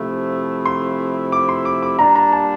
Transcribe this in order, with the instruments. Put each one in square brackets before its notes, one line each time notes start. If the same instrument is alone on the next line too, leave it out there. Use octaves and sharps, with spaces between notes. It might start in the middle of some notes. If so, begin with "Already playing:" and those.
Already playing: [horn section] C3 F3 A3 E4
[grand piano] C6
D6
C6
D6
D6
[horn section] A#2 G3 A#3 D4 [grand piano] A#5
[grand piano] A#5
A5